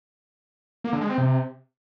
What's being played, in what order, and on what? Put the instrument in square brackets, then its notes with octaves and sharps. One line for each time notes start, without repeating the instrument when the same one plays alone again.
[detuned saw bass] A#3
D3
G#3
C4
C3